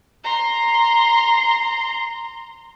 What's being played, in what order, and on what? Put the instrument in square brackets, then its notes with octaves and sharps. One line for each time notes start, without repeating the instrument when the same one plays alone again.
[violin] A#5 C6